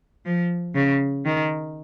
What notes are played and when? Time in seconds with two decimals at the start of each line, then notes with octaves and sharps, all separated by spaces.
0.26 F3
0.75 C#3
1.25 D#3